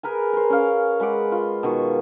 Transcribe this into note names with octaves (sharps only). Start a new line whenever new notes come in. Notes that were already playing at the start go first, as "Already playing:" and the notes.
G#4 A#4 B4 G#5
A#4 C5
C#4 F5
G#3 B4 F#5 D6
F4
B2 D#3 C#6